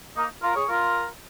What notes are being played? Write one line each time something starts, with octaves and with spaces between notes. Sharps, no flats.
A#3 D#4
F4 A#4
G#4 C#5
F4 A#4